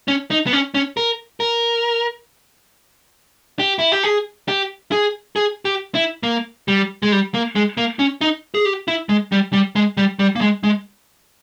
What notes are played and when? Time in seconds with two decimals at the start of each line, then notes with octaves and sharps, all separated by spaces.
0.08 C#4
0.31 D#4
0.47 B3
0.53 C#4
0.74 C#4
0.97 A#4
1.40 A#4
3.59 G4
3.79 E4
3.92 G4
4.03 G#4
4.48 G4
4.92 G#4
5.36 G#4
5.65 G4
5.95 E4
6.23 A#3
6.68 G3
7.03 G#3
7.12 G3
7.34 A#3
7.56 G#3
7.77 A#3
7.99 C#4
8.21 D#4
8.54 G#4
8.65 G4
8.88 E4
9.09 G#3
9.32 G3
9.53 G3
9.76 G#3
9.97 G3
10.19 G3
10.36 A#3
10.41 G#3
10.63 G#3